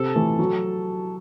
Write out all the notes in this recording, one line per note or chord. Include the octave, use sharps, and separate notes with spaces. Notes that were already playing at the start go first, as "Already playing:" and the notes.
Already playing: C3 A4
E3 A3
F#3